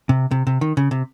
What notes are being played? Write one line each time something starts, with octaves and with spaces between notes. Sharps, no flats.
C3
C3
C3
D#3
C#3
C3